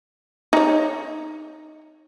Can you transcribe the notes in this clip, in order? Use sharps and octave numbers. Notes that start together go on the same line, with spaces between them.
D#4 C#5